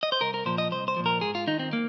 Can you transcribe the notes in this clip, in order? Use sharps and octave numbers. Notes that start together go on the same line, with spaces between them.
D#5
C5
C2 A#4
A#4
A#2 F3 C5
D#5
C2 C5
C5
A#2 F3
A#4
G#2 G#4
F4
D#3 D#4
C4
A#3